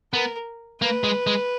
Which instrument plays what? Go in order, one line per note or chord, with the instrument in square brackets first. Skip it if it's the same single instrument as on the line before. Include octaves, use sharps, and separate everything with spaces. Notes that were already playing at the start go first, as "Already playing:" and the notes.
[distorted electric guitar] B3 [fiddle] A#4
[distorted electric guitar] A#3 [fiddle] B4
[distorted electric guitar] G#3
G#3